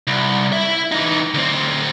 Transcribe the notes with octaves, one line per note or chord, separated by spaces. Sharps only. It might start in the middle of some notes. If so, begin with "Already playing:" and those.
C2
E4 E5
E3 D#4
D2 C4